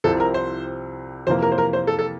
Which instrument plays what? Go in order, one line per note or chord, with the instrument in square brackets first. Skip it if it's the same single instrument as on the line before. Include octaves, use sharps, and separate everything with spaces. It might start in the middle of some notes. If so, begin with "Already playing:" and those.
[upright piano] C2 C3 F3 C4 E4 [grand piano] A4
[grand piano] A#4
C5
[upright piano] F2 C3 E3 A#3 [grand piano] C5
[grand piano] A#4
C5
A#4
C5
A4
A4